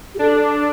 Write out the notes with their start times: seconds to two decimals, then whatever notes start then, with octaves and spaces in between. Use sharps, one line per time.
0.15 G4
0.19 D4 A4